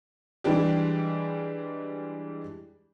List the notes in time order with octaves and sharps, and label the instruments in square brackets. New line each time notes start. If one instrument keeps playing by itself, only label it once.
[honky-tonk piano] E3 G3 G#3 D4 G4